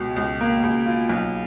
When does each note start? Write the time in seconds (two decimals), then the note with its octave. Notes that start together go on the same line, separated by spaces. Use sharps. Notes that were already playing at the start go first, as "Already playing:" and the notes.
Already playing: C#2 B2
0.16 C#2
0.41 A#3
0.63 C#2
0.86 F4
1.09 B1